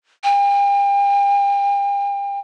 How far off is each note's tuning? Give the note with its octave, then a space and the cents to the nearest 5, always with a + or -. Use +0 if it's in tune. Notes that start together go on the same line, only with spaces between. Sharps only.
G5 +40